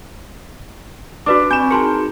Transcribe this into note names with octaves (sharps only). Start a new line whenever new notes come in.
D4 F#4 B4 D5 D6
C4 G#5 B5 C#6 G6 E7
D#4 F#4 G#4 A#4 A5 C6 C#7